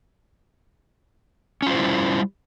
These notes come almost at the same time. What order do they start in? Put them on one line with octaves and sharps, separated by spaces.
C#4 F4 C5 E4 G3